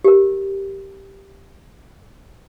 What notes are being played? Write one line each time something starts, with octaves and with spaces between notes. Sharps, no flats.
G4 A#4